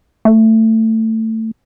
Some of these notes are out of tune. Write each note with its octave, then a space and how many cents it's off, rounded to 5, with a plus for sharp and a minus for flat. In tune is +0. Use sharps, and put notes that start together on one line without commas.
A3 +20